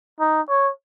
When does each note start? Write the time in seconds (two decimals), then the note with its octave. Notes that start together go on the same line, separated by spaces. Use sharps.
0.20 D#4
0.49 C#5